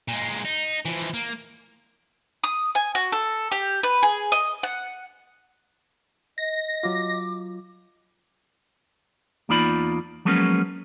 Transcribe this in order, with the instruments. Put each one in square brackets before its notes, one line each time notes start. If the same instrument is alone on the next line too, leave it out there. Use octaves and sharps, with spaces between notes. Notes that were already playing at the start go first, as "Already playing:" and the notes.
[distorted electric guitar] A#2 G#3
D#4
E3 F3
A#3
[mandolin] D#6
G#5
F#4
A4
G4
B4
G#4
D#5
F#5
[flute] D#5 [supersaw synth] A#6
[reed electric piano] F#3 F4 [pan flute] D6
[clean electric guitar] E2 A#3 D#4 F4 D5 B5
F3 F#3 G#3 A#3 B3 C#4